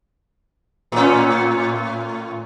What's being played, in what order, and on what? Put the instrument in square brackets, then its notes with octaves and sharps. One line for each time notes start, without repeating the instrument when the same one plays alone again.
[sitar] A2 C#4